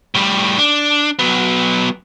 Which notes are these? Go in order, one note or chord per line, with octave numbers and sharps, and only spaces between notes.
A2 G3
D4
F#3 B3